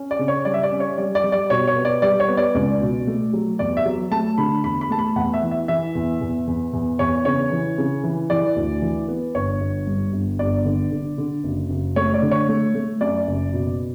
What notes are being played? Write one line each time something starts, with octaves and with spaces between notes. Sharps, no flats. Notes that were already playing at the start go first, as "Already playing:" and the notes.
Already playing: C#4
D5
C#3
C#5
G3 D5
E5
D5
C#4
C#5
G3 D5
D5
G3
D5
B2 C#5
C#5
B3
D5
G3 D5
C#5
B3
D5
C#2 D5
B2
A3
F#3
E2 D5
E5
F#3
A3 A5
D3 B5
E2 B5
B5
A3 A5
B5
E2 F#5
E5
E3
E5
E3 E5
E2
E2
E2
E2
E2 C#5
C#3 C#5
E3
C#3
E3
E3 D5
D2
E3
B3
G1 C#5
G1
G2
G1
G1 D5
D3
D3
D3
F#1
F#1
A3 C#5
D5
D3
C#5
A3
A3
F#2 D5
F#1
B2